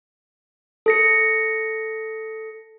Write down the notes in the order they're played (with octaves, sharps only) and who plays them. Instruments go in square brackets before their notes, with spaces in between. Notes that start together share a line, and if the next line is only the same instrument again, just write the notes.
[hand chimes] A4 A#6 C#7